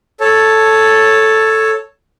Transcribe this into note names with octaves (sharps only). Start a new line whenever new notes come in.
A4 C#5 A5